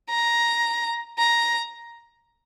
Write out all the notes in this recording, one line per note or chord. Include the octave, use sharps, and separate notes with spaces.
A#5
A#5